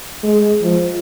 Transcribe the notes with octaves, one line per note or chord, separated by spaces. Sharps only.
G#3
F3